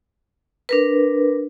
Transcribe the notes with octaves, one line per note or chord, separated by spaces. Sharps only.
D4 A#4 B4